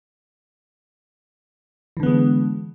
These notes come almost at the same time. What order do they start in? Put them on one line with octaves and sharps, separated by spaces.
E3 D3 B3 G#3